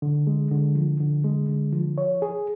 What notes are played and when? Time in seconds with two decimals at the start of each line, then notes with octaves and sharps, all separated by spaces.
0.02 D3
0.27 G#3
0.51 D3
0.75 F3
1.00 D3
1.24 G#3
1.49 D3
1.73 F3
1.98 C#5
2.22 G#4